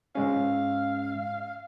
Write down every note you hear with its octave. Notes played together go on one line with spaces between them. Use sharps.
G#2 G#3 C#4 F5